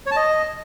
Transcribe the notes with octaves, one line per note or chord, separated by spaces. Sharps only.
C#5
A5
D#5